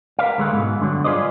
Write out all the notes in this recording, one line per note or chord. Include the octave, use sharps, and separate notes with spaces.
A#4 B4 D5 F5
D2 G#3 A3 B4
G#2 B2
G2 D3 F#3
F4 G#4 B4 C5 D5 D#5